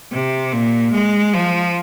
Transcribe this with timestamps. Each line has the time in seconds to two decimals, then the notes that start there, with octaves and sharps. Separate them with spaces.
0.12 C3
0.53 A#2
0.93 G#3
1.34 F3